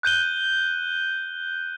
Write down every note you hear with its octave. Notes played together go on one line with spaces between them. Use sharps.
F#6 G6 D#7 G7